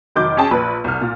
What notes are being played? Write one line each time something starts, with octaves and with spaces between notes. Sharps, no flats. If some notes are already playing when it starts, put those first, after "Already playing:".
F1 D#3 F#3 D6 G6
C#4 G#4 G5 A5
A#1 B4
C2 F6
A#2